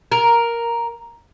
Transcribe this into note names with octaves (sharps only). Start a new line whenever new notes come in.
A#4